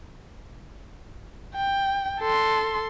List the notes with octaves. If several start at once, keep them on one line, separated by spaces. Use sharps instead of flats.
G5
A4 C6